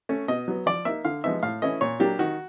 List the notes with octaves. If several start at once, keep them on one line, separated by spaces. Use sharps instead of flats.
A3 C#4
B2 D#5
F#3 B3
F3 D5
A#3 D#4 E5
D3 F5
F3 G#3 B3 D#4 E5
A2 F5
E3 A3 C#4 E4 D#5
A#2 C#5
F#3 A#3 D4 G4
D#3 F#4